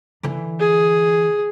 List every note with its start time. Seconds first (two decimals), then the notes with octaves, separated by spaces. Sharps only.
0.23 D3 E3
0.59 G#4